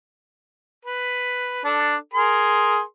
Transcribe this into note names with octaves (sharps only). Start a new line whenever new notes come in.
B4
D4 A4
G#4 A#4 C6